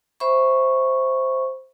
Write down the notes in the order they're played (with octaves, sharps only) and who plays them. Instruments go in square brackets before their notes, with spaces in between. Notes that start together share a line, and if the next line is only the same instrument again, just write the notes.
[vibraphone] C5 E5 B5 C#6